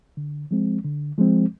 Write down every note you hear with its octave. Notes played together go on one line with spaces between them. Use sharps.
D3
F3 G#3 C4
D3
F3 G#3 C4